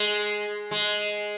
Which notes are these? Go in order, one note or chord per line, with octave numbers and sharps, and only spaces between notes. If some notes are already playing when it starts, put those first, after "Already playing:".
Already playing: G#3
G#3